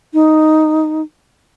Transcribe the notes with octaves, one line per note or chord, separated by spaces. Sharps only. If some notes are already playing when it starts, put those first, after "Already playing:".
D#4